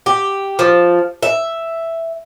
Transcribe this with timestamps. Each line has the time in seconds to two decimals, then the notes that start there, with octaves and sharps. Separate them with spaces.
0.06 G4
0.59 F3
1.23 E5